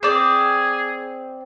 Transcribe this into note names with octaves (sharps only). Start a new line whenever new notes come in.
C4 G#4 D5